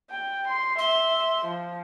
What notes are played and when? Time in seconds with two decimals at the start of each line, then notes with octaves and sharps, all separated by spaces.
0.11 G5
0.48 C6
0.79 E5 C6
1.46 F3